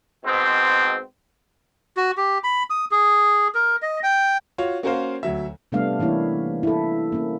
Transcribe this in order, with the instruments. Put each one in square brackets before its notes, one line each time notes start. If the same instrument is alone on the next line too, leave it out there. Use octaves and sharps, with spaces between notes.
[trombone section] G#2 B2 C4
[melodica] F#4
G4
B5
D#6
G#4
A#4
D#5
G5
[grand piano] F4 F#4 C#5
A#3 C#4 F#4 A#4 C5 F5
D2 F#3 E5
[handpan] C3 G3 A3 B3 D4 F5
E3 A#3 C#4 E4 C#5
E4 A4
A#3 C#4